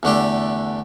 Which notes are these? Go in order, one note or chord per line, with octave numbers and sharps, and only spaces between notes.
E2 D3 A3 D4 G4